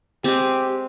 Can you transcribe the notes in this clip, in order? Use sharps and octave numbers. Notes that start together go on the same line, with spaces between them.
G#3 C4 G4